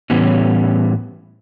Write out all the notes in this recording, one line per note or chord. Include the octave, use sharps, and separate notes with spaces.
A2 E3 G3 B3 C#4